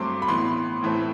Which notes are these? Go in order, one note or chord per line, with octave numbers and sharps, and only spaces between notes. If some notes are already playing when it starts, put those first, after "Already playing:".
Already playing: G2 F#3 A3 C4 C6 D6
B5
A2 E3 B3 C6
A2 E3 A3 C4